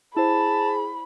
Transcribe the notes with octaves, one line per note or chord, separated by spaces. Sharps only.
E4 G#4 C5 A5 B5